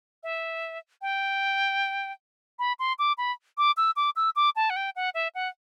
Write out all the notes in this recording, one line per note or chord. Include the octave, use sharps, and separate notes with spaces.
E5
G5
B5
C6
D6
B5
D6
E6
D6
E6
D6
A5
F#5
G5
F#5
E5
F#5